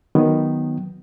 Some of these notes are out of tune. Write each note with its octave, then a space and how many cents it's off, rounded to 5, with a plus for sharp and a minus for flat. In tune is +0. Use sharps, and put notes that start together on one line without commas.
D#3 +0 F#3 +0 B3 +0